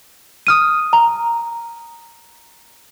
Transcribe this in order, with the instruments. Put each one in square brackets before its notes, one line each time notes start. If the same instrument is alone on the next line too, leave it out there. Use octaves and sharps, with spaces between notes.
[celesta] D#6 F6 D#7
A#5